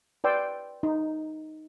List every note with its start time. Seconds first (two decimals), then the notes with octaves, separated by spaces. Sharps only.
0.24 B4 D5 G5 C6 E6
0.83 D#4